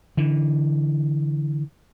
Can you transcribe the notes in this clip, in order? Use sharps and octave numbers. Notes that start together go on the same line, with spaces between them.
D3 E3